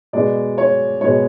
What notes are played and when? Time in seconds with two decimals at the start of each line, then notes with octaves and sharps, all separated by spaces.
0.13 B2 G#3 B3 D5
0.58 C#5
1.01 B2 G#3 B3 C#5